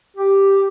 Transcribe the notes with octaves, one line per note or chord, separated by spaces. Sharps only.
G4